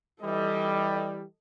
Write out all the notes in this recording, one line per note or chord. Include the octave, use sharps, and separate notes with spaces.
E3 G3 A4 D#5